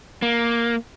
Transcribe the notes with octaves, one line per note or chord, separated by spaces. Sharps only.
A#3